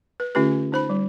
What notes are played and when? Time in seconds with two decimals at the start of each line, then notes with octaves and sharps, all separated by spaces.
0.20 B4
0.35 D3 A3 C#4 F4 G4 B4
0.72 D#4 C5 B5
0.90 G3